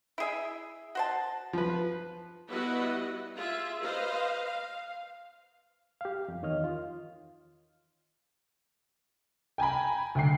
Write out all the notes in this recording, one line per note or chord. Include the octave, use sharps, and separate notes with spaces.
E4 G#4 E5
F#4 C5 A5
F3 B4
G3 B3 E4 F#4 B4 D#5
F4 G#4 E5
B4 C5 D#5 F5
F5
G4 F5
F2
E2 D#3 C#5 D#5 F6
F4
G5 G#5 A#5 B5
D2 G5 C7